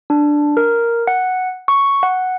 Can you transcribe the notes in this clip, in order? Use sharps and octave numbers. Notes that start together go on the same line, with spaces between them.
D4
A#4
F#5
C#6
F#5